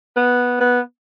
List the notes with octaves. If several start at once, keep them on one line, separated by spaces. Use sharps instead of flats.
B3
B3